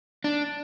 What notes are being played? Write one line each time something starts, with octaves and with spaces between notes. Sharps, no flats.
D4